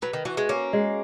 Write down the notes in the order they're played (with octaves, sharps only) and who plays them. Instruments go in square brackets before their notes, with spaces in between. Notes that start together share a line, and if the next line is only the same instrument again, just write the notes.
[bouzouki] F#3 [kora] B4
[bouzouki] D#3
[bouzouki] E3 [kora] F#4
[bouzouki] G#3
[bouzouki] A#3 [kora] C#4
[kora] G#3